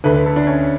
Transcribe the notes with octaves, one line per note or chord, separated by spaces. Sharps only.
D2 D3 B4
B4
A4
D4
C#4